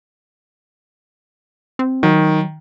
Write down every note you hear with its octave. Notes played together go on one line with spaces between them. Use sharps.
C4
D#3 F#3